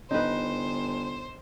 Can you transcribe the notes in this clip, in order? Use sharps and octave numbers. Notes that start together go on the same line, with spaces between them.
G1 D#4 B4 C5